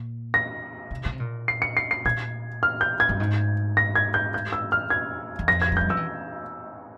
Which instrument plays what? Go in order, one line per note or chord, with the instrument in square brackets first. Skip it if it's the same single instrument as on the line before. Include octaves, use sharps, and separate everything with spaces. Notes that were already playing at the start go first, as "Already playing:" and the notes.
Already playing: [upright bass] A#2
[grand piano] A#6
[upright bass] C3
C#3
C3
A#2
[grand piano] C7
C#7
C7
C7
[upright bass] A#2 [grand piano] G#6
[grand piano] F6
G6
G#6
[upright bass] G2
G#2
[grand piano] A#6
G#6
G6
G6
E6
F6
G#6
[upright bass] E2
[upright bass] F2 [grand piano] A#6
[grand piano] G#6
[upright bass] G#3
[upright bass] G3 [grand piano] G6
[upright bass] F3 [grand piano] E6
[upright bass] E3